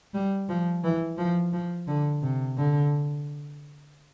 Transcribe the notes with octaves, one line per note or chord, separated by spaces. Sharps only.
G3
F3
E3
F3
F3
D3
C3
D3